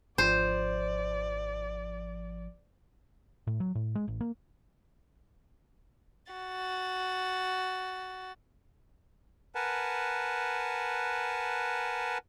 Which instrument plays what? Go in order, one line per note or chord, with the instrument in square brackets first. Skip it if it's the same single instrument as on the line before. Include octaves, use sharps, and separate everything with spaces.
[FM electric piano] G#1 F3 [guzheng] C5 [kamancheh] D5
[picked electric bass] A2
F#3
A2
G#3
A1
A#3
[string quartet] F#4 A6
[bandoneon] A#4 B4 F#5 G#5 A5